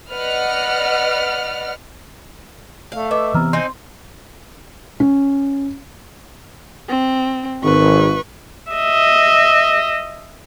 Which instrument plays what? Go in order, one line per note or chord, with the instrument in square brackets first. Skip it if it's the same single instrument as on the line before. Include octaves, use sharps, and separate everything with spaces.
[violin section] B4 D5 D#5 F#5 F6
[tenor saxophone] A3 [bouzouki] F5
[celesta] B4 D#5 D6 [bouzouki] E5
[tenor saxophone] C3 [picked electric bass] E3 B3 [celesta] A#5 E6 F6
[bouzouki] C4 D#4 G#5 [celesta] C6
[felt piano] C#4
[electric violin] C4
[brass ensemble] G#1 [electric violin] B4 C#6
[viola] D#5 E5